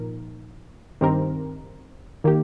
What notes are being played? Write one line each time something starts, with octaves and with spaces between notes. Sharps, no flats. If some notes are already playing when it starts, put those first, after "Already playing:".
Already playing: A#2 F3 D#4 A#4
G2 D#3 C4 G4 A#4
D#3 A#3 G4